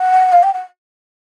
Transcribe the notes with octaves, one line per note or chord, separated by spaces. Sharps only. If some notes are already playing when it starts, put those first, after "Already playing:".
Already playing: F#5
F5
G5
F#5